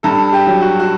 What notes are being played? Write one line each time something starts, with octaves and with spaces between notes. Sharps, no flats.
G2 A4
G4
F#3
F#4
F#4